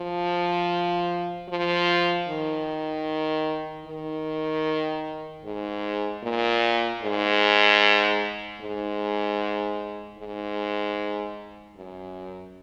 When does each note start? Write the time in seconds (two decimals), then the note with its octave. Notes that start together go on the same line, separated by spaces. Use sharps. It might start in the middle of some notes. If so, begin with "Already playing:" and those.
Already playing: F3
1.49 F3
2.28 D#3
3.86 D#3
5.45 G#2
6.23 A#2
7.03 G#2
8.60 G#2
10.18 G#2
11.76 F#2